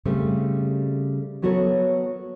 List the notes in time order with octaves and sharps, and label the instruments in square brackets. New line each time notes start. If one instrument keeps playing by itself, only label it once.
[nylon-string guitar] C#3 G3 A3 C4
F#3 B3 F#4 A4 A#4 C#5